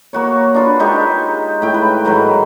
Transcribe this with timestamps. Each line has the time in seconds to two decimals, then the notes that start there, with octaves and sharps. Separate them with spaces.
0.13 A#3 F#4 C#5
0.54 D4 F4 B4
0.79 G#3 D#4 G4 C#6
1.62 A2 G5
1.74 B4
2.05 G#2 D#3 F#3 B4